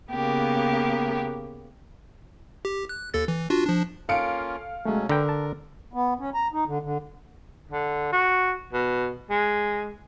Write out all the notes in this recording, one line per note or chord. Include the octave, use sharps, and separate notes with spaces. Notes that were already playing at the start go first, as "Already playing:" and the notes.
C#3 A#3 B3 G4 A#4
G4
F#6
D#2 A4 A6
E3
D4 F4 F#4
F3 D4
A#3 C#4 F4 A4 F5 C#7 D7
B2 F#3 G#3 A3 C#4
D3 A#4 B4 G5 A#5
A5
B3
C#4
A#5
D#4
D3
D3
D3
F#4
B2
G#3